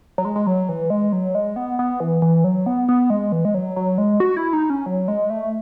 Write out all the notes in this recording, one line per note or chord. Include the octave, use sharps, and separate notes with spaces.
F#3
G#3
G#3
F#3
E3
G#3
F#3
G#3
B3
B3
E3
E3
F#3
B3
B3
G#3
E3
G#3
F#3
F#3
G#3
F#4
E4
D#4
C#4
F#3
G#3
A3